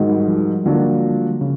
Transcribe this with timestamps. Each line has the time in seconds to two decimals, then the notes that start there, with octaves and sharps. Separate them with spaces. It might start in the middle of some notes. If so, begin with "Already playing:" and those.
Already playing: G#2 D#3 F#3 G#3
0.09 G3
0.28 F3
0.66 D3 F#3 A#3 D4 F4
1.41 C#3